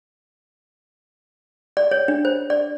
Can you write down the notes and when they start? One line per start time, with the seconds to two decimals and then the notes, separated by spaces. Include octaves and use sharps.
1.77 D5
1.91 C#5
2.08 D4
2.25 C5
2.50 D5